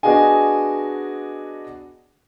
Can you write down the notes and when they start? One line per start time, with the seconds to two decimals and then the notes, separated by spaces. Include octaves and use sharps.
0.03 B3 D4 F#4 G#4 D#5 G#5